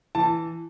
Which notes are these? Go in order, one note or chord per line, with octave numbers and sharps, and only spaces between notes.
E3 A5